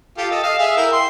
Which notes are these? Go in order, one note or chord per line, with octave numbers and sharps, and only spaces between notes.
F4 G4 A4
A4 D#5
D#5 F5
G#4 E5 F5
E4 A#4 G5
C6